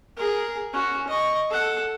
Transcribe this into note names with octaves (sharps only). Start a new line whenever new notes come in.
G#4 A#4
C#4 F#4
D#5 C#6
A4 F#5